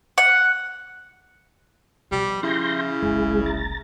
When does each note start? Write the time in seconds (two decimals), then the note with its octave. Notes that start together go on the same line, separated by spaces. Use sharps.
0.18 F#5
2.11 B2 F3 G3
2.43 C#3 E4 C6 G6 A#6
3.02 F#1 C2 G#3 G#4
3.46 A#5 A6